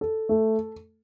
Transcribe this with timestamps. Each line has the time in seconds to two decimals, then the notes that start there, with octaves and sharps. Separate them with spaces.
0.01 A4
0.29 A3